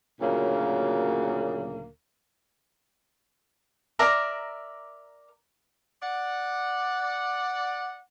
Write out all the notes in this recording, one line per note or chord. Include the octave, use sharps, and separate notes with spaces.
D2 A#2 C#3 F#3 A#3
A#4 D5 E5 A#5
D5 F#5